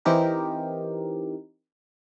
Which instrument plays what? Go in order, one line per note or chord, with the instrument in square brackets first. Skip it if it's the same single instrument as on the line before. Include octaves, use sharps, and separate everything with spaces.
[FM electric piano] E3 C4 D#4 G4 A#4